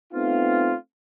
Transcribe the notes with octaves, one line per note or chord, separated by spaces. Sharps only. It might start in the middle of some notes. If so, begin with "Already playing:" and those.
A3 B3 C4 D#4 F4